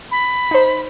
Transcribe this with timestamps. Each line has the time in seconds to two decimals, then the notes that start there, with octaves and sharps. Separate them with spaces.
0.11 B5
0.51 D#4 C5